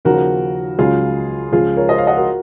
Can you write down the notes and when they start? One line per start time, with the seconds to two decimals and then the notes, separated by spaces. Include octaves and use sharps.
0.05 D#2 C#3 F3 F#4 A#4
0.79 C#2 C#3 F#3 F4 G#4
1.52 C#2 C#3 F3 F4 G#4
1.76 A#4 C#5
1.89 C5 D#5
1.98 C#5 F5
2.07 D#5 F#5
2.17 F#4 A#4